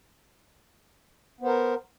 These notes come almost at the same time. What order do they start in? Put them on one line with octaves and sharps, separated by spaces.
B3 C5 A#4